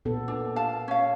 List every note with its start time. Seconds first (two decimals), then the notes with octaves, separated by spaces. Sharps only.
0.05 A#2 B3 A4
0.28 D4
0.56 F5 A5
0.88 C#4 F5